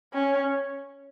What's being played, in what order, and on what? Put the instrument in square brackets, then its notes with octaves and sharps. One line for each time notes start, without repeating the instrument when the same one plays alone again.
[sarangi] C#4